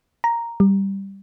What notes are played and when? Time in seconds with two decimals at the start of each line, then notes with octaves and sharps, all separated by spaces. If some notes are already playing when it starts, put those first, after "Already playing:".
0.24 A#5
0.60 G3